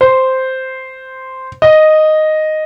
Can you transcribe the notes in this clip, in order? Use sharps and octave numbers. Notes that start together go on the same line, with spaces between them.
C5
D#5